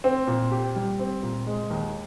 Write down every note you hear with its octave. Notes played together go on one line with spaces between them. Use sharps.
C4
A#2
G4
G3
C4
A#2
G#3
D#2